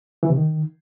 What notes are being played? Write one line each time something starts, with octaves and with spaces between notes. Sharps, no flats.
E3
C3
D#3